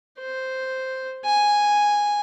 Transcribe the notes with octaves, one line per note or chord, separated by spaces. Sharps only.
C5
G#5